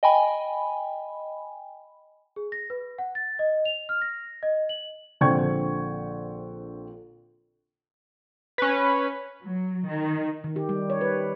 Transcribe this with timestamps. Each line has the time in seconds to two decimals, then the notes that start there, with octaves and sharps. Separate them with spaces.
0.03 D#5 G5 G#5 B5
2.36 G#4
2.52 A#6
2.70 B4
2.98 F#5
3.15 A6
3.39 D#5
3.65 F7
3.89 F6
4.02 A#6
4.43 D#5
4.69 F#7
5.21 A#1 D3 C4 G5 C#6 G#6
8.58 C#4 B4
9.41 F#3
9.87 D#3
10.44 D#3
10.56 G4
10.69 G3
10.90 C#5
11.01 B4